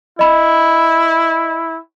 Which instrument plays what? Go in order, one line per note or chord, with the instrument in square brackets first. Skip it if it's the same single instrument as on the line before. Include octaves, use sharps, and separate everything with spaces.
[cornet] E4 [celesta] D#5 B5